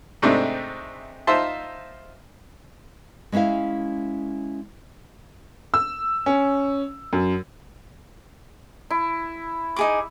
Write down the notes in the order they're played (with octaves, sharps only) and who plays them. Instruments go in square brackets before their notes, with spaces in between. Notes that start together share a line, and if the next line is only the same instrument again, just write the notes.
[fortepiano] G#2 C3 A3 C4 D4 D#4
D#4 F4 C5 E5 A5 C6
[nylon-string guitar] G#3 C#4 E4 E5 F5
[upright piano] E6
C#4
F#2
[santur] E4
[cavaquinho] D#4 G#4 D6